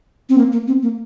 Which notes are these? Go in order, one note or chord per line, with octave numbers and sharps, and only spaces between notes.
C4
A#3
A#3
C4
A#3